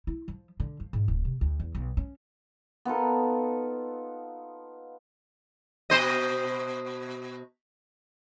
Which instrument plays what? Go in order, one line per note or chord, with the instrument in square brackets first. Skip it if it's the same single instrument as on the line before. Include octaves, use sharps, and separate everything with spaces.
[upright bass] E4
F3
D3
F3
G#2
D1
C3
D2
E2
B1
C#4
[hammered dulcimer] B3 D#4 F4 A4
[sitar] B2 C5 D#5